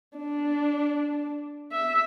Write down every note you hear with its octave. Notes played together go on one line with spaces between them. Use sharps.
D4
E5